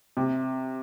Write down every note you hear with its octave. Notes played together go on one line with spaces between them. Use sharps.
C3